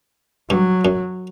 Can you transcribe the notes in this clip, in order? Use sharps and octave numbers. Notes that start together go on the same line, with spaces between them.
G2 F#3
F#2